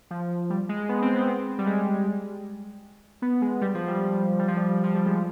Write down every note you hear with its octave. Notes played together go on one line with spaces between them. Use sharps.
F3
G3
G#3
B3
C4
B3
G3
G#3
B3
G#3
G3
F3
G3
G3
F3
G3
F3
G3
G#3